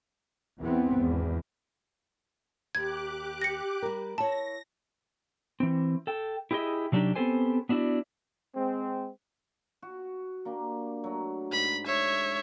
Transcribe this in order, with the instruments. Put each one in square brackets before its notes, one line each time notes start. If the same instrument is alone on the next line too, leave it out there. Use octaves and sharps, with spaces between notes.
[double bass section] E2 E3 B3 C4
G#1 E2
[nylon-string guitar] D#2 [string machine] G4 D6 F#6 [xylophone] G#6
[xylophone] A#6 C#7
[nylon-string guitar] G3 A#4
[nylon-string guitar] E4 C#5 [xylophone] A5 [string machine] A#6
[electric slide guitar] E3 C4
A4 G5
E4 G4 G#4 C#5 D#5 E5
C3 F#3 D4 D#4 G4
B3 C4 G4 A4 C5 G#5
B3 D4 E4 F#4 D5
[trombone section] G#3 C4
[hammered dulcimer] F#4
A#3 D4 G4
F#3 A3
[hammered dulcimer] G#2 [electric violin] B5
[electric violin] C#5 E5